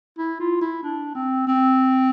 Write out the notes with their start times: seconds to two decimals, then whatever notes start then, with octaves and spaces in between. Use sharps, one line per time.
0.18 E4
0.40 F4
0.61 E4
0.83 D4
1.15 C4
1.47 C4